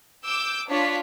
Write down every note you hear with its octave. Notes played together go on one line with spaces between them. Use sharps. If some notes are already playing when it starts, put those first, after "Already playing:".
D6 E6 G6
D4 F4 C#5 B6